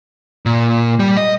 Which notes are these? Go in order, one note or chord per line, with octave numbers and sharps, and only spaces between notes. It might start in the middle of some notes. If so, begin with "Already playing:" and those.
A#2
G3
D#5